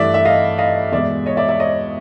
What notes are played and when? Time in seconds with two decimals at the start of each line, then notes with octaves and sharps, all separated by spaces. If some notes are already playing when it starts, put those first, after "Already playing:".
Already playing: G2 E3 A3 D5 E5
0.14 E5
0.25 D#5 F5
0.58 D#5 F5
0.92 E2 B2 G#3 D5 E5
1.26 C#5 D#5
1.37 D5 E5
1.48 D5 E5
1.60 C#5 D#5